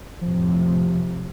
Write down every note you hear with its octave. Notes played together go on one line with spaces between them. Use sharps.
F2 A2 C3 F3